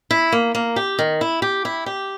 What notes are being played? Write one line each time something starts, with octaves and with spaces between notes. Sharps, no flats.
E4
A#3
A#3
G4
D#3
E4
G4
E4
G4